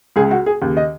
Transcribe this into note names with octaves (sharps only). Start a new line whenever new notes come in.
C#2 C#3 G#4
F#4
G#4
D#2 C#3
D#5